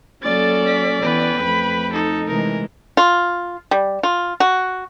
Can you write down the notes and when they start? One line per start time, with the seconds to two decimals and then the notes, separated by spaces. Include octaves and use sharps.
0.23 F#3 A#3 C#4 A4 D5 A6
0.67 B6
1.02 E3 B3 B4 G5
1.40 F2 A3 B5
1.93 D#4 A4
2.27 C3 E3 G#3 A#4
2.97 F4
3.71 G3
4.03 F4
4.40 F#4